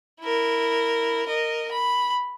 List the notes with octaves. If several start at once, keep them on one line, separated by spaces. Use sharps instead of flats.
E4 A#4
A#4 D#5
B5